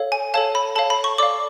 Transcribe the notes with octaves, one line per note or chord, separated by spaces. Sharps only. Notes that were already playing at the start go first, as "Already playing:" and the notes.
Already playing: A4 C#5 F5
G#5
A4 C#5 F5 A5
B5
A4 C#5 F5 A5
B5
C#6
A4 D5 F5 D6